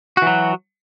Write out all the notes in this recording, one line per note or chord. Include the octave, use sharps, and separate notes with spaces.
E3 F#3 F#4